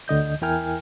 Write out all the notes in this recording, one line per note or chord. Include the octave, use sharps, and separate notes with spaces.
D2 D3 D#5 G6
E2 E4 A#4 G5 G#5 F6